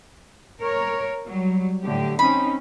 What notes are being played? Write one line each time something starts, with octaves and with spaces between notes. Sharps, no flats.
A#4 C#5
F#3 G3
A2 D3 G4
C4 C#4 D#4 B5